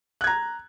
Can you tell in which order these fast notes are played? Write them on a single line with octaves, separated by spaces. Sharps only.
F#6 G#6 A#5